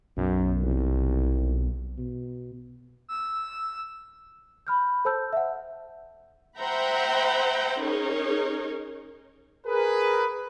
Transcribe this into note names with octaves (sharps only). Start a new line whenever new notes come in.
B1 F#2
C2
B2
E6
B5 F6 G6
A4 C5 A5 E6 G6
E5 F#5
C5 E5 F#5 G5 A#5 B5
C#4 D#4 G#4 A#4 C#5
G#4 A#4 B4